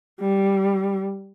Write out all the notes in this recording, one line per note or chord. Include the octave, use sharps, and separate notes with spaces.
G3